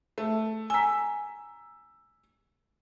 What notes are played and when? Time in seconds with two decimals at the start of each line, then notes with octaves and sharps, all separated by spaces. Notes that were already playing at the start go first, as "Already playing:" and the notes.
0.18 A3
0.70 G#5 A#5 E6 B6